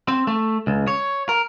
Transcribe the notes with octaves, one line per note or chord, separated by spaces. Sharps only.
C4
A3
C#2
C#5
A#4